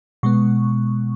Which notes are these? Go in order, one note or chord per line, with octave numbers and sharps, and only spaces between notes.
B2 G#3 B3 C#6